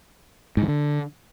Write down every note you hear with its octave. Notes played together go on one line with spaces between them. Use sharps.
G#2
E3
D3